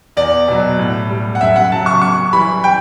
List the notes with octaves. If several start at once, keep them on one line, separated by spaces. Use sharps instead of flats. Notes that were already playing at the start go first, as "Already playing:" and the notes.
E2 D5
B2 F#3
A2
G3
F#5
F#2 E5
F#5
C#3 F#3 A5
C#6
F#2 C#6
E3 G3 B5
G5